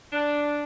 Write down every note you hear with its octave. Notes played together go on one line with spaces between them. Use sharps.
D4